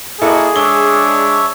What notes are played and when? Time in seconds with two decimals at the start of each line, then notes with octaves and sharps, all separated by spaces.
0.22 A#3 E4 F#4 G#4 A4 D#5
0.56 G#3 D4 C#5 E5 G7